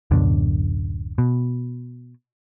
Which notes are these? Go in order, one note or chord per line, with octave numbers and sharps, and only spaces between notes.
D1 F#2 B2 D3
B2